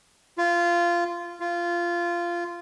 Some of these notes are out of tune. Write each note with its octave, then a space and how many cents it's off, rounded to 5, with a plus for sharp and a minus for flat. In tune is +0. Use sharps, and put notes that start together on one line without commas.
F4 -15
F4 -15